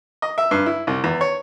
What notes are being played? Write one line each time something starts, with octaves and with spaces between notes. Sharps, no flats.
D#5
E5
G2
E4
C2
E2
C#5